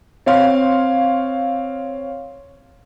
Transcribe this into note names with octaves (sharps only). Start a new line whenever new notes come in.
C4 C#5 F5 C6